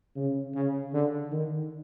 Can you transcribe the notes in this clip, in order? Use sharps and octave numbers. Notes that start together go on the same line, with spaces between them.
C#3
C#3
D3
D#3